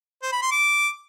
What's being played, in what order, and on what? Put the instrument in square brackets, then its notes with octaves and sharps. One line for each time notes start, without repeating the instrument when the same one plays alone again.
[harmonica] C5
B5
C6
D6